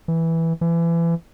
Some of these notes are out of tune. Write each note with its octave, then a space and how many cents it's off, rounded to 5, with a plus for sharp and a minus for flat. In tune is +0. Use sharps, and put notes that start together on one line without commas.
E3 -5
E3 +30